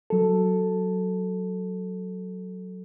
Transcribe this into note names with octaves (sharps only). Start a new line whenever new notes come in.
F#3 A4